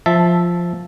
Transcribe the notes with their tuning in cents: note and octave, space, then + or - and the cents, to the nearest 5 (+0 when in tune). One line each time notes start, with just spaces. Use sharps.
F3 +0 E5 +0 A5 +0